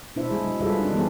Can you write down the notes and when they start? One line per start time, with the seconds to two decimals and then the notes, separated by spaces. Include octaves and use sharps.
0.16 B2 D4 E4 C5 E5
0.30 C3 G#3 G#4
0.44 F#3 D4
0.61 G3 F4 G#4 A4 B4 E5
0.79 C4 D4 D#4
0.93 E3 G3 B3 G#4 A#4